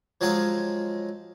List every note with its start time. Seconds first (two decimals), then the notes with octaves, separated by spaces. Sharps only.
0.21 F3 F#3 G#3 G#4 D#5 F5